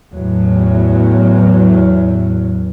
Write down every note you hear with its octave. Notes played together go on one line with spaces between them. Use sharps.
E2 A2 F#3